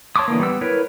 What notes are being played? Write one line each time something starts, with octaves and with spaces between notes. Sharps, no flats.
C#5 A5 C6 D6 D#6
D3 E3 A#3
G3 B3 E6
E4 A#4 B4 C#5